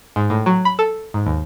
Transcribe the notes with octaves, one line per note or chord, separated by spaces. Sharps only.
G#2
A2
F#3
B5
A4
G#2
D#2